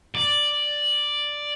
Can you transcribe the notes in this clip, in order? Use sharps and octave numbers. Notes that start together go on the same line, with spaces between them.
D5